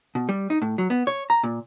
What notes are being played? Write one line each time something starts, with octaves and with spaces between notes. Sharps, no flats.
B2
G3
D#4
A2
F#3
B3
C#5
A#5
A#2